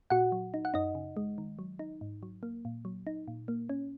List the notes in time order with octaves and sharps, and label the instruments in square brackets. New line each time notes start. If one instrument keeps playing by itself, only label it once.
[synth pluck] A#2 F#4 F#5
F#3
D#4
F#5
F#2 D#4 D#5
C#3
G#3
D#3
F#3
D#4
G#2
F#3
A#3
A#2
F#3
D#4
A#2
A#3
C#4